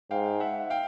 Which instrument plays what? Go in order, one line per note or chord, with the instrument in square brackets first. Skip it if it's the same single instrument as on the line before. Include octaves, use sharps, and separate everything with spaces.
[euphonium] G#2 [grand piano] F5 G5
[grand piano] E5 F#5
F5 G5